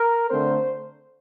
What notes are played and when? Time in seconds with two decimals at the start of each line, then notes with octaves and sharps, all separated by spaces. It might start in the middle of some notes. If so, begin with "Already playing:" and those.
Already playing: A#4
0.28 D3 A3 C4 C5